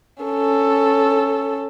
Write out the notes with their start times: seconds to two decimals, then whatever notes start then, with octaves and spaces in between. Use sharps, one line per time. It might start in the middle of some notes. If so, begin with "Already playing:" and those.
0.24 C#4 A4